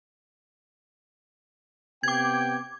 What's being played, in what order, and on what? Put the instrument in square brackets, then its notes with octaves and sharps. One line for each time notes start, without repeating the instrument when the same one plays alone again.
[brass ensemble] C3 B3 G5 [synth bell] D6 G#6